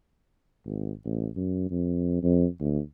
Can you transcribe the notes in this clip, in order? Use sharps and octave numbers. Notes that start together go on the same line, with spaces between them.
G#1
A1
F#2
F2
F2
D2